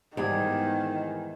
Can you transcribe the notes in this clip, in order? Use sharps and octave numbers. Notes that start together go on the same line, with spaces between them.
E2 G#2 D#3 G3 G#4 G#5